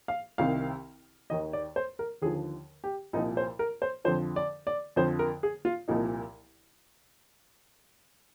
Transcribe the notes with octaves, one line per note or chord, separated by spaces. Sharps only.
F5
C2 C3 D#3 F5
D#2 D#3 D#5
D5
C5
A#4
D#2 D3 F3 G#4
G4
C2 A#2 F3 D#4
C5
A#4
C5
F2 D3 F3 C5
D5
D5
F2 D3 F3 C5
A#4
G#4
F4
C2 A#2 F3 D#4